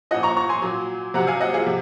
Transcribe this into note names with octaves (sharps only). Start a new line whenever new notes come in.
A#2 F3 D#5 F#5
A#5 C#6
A#5 C#6
G#5 C6
A#2 F#3
C3 F#3 F#5 A#5
F5 G#5
D#5 F#5
F4 G#4
C3